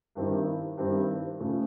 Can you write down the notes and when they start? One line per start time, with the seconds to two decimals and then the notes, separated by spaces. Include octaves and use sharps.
0.15 G2 D#3 G3 C4 E4
0.77 G2 D#3 G3 C4 E4
1.39 C#3 F3 A3